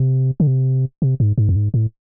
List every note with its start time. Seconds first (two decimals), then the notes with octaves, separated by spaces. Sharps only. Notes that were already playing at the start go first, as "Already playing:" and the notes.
Already playing: C3
0.40 D3
0.47 C3
1.02 C3
1.20 G#2
1.38 G#2
1.49 F2
1.56 G#2
1.74 A2